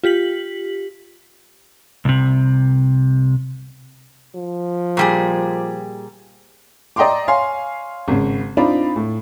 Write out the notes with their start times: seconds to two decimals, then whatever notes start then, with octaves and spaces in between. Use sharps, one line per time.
0.04 F4 G4 B6 F#7
2.05 C2 C3
4.36 F3
4.97 A#2 G3 G#4
6.96 D5 D#5 G5 A#5 C6 D6
7.28 C#5 F5 G#5 C6
8.08 G#1 C#3
8.57 C4 D4 D#4 F4 D5 B5
8.96 A2